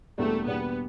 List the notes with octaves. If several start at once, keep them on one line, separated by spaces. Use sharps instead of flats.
E2 B2 G3 A3 A#3 D4
E2 B2 G3 A#3 B3 D4